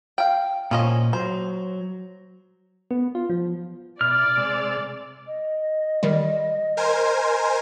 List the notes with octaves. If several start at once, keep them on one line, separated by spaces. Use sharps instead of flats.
F5 G5
A#2 F3 C#4 D#5
F#3 C5
B3
F4
F3
B2 E4 D5 F6
C3 G#3 E6
D#5
D#3 G3
A#4 C5 G#5